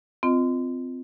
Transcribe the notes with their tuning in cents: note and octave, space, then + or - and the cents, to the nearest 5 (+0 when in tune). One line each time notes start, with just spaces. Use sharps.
C4 -25 F4 +0 D#5 +0